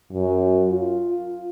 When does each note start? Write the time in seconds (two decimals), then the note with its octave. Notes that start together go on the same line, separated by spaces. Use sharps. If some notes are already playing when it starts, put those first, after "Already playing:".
0.13 F#2
0.69 F4